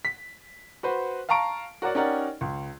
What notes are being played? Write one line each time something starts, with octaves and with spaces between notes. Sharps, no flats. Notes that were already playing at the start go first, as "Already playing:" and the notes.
B6
F#4 B4 C5
F5 A5 A#5 C#6 D7
F#4 A#4 C#5 D5 F#5
C#4 D#4 G4 A#4 D5 F#5
C#2